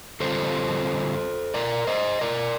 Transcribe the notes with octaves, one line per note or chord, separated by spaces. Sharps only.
D3 G3 C4 F4 A4 C5
A#4 D5
C5 D#5
A#4 D5